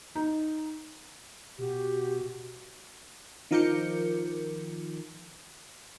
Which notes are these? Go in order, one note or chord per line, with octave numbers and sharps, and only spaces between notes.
D#4
B2 F#4 G4
D#3 F3 A#4 D6 G6 C#7